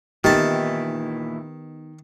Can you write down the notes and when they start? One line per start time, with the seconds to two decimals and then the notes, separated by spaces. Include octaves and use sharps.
0.24 A#2 D#3 E3 B3 D#4 E4 G4 A5